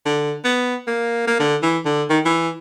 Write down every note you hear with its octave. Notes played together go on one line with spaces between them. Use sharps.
D3
B3
A#3
A#3
D3
E3
D3
D#3
E3